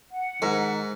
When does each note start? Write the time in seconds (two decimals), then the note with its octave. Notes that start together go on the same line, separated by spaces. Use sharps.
0.11 F#5
0.42 G#2 D#3 A#4